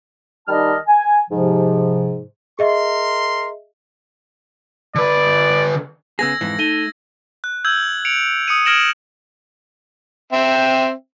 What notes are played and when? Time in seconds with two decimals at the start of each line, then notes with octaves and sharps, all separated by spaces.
0.48 D#3 G3 D#4 D#5 A5 F6
0.87 G#5
1.30 G#2 C3 F3
2.59 G#4 A#4 D#5 E5 C6
4.95 D3 B4 D5
6.19 C#3 B3 G#4 E6 G#6 A#6
6.41 F2 G#2 E3
6.59 A3 D#4 D#7 G7
7.44 F#6
7.65 E6 G6 G#6 F#7
8.05 C#7 D7 F7
8.48 D#6 C#7 D#7
8.66 F6 G#6 A#6 D7 E7 F#7
10.33 C4 E5 G5